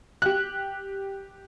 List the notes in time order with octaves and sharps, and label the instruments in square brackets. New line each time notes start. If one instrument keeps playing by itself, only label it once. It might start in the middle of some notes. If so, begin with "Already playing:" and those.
[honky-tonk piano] G4 F#6